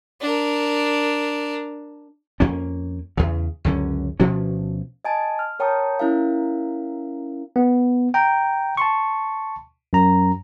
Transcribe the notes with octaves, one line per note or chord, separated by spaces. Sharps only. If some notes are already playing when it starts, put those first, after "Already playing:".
D4 A#4
F2 A#3 C#4
E2 C#3
C#2 F#2 D3 C#4
D2 B2 F3 C#4
D#5 G#5 A5
F6
A#4 C#5 G5 A5 A#5 D#6
C#4 E4 A#4 F5
B3
G5 A#5
A5 C6 C#6
F#2 A#5